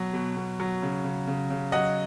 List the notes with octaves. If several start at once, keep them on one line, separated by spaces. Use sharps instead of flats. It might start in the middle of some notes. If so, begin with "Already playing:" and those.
Already playing: B2 F#3
B2
B2
F#3
C#3
C#3
C#3
C#3
F#3 D#5 F#5